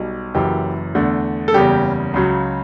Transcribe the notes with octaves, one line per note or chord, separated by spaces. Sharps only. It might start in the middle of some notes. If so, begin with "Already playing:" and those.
Already playing: B1 B2 G3
F#1 F#2 E3 G4
E2 D3 A3
A4
F#1 E2 C#3 G3 G4
C#2 C#3 F#3